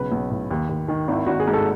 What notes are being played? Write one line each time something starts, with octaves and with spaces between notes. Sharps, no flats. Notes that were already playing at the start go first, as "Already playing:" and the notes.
Already playing: B1 C#3 B4
B1
A2
D#2
D#2
D#3
G#1 E4
G#1 F#4
G#4
G#2
A4